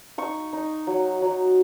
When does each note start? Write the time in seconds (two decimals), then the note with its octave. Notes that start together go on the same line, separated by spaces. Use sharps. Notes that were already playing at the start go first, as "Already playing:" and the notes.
0.18 D#4 C#6
0.53 D#4
0.87 F#3
1.22 F#3